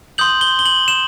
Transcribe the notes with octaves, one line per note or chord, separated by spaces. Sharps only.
C6 D#6 G6 F#7
G7
G7
F#7
E7